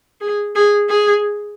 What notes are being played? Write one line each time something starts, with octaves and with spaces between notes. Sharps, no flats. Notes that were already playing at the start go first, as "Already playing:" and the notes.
G#4
G#4
G#4